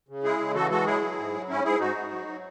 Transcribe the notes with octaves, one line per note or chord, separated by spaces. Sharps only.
C#3
G#3 E4 G#4
C#3
E3 F#4 A4
G#3 F#4 A4
F#3 E4 G#4
F#3
G#2
F#3
G#2 C#4 E4
G#2 E4 G#4
G#2 D#4 F#4
G#2
F#3
F#3